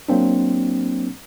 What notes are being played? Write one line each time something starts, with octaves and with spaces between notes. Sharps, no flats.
F#3 A#3 C4 D4